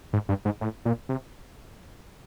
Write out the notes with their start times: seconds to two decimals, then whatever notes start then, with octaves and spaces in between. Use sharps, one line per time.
0.13 G#2
0.29 G2
0.45 G#2
0.61 A2
0.85 A#2
1.09 C3